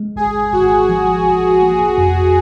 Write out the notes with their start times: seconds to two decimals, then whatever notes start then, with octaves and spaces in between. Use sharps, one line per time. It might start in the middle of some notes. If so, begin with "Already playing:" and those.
Already playing: G#3
0.16 G#1 G#4
0.53 G#1 F#4
0.89 F3
1.26 G#1
1.62 A#3
1.98 F2